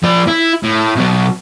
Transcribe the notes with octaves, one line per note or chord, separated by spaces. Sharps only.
F3 D5
E4
A2
B2 F#3